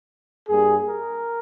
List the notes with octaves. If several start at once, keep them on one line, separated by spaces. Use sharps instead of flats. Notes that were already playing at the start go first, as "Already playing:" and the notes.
G2 G3 A#3 G#4
A#4